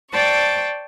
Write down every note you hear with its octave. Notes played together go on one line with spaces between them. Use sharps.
C5 D5 G5 A5 C#6